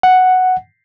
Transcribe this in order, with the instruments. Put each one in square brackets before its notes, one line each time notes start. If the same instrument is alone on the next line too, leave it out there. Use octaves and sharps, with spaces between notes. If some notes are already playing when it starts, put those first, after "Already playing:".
[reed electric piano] F#5